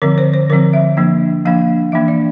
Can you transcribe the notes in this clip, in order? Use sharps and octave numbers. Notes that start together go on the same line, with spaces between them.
D3 F3 C4 A#4
C5
C5
D3 F3 C4 A#4
E5
F3 A#3 D4
F3 A#3 D4 F5
E3 A#3 D4 E5
D5